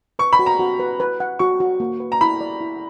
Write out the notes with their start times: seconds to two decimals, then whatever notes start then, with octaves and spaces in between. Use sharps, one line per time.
0.19 B4 C#6
0.33 B5
0.39 F#4
0.46 A#5
0.59 F#4
0.80 B4
1.00 B4
1.20 F#5
1.39 F#4 C#6
1.60 F#4
1.80 A#3
2.00 B4
2.12 A#5
2.21 E4 B5
2.41 D5
2.61 E4